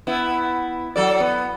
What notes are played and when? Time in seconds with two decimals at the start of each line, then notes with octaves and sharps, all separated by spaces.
0.07 B3 E4
0.96 F#3 A4 D5
1.20 B3